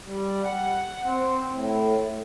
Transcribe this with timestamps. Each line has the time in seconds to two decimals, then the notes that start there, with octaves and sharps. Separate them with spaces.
0.04 G3
0.43 F#5
1.04 C4
1.51 A2